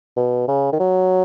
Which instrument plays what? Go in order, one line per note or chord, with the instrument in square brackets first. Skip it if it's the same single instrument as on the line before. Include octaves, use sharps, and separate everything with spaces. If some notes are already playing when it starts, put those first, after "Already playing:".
[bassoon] B2
C#3
D#3
F#3